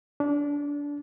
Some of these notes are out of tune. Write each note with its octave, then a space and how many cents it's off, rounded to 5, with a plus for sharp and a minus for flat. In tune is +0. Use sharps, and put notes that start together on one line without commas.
D4 -25